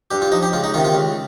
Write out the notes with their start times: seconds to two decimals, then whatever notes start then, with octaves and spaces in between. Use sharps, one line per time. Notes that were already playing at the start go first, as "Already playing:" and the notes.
0.11 G2 G4
0.22 F4
0.32 F3 D#4
0.43 G4
0.53 C#2 F4
0.64 D#4
0.74 C3 D#3 F4
0.85 F4
0.95 C#2